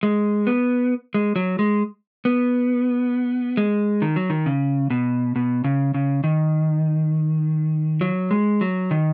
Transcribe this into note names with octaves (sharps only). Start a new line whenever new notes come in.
G#3
B3
G#3
F#3
G#3
B3
G#3
D#3
F#3
D#3
C#3
B2
B2
C#3
C#3
D#3
F#3
G#3
F#3
D#3